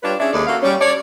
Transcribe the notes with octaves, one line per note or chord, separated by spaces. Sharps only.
G3 D4 F4 B4 C#5
C#4 D4 G#4 E5
D#2 G#3 D#4 G#4 A4 D5
A#3 F#4 A4 F5
G3 C#4
C#5 D5